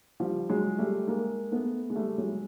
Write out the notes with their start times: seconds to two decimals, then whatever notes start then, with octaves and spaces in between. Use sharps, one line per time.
0.20 F3 G3
0.50 F#3 G#3
0.78 G3 A3
1.07 G#3 A#3
1.51 A3 B3
1.90 G#3
1.96 G3 A3
2.18 F#3 G#3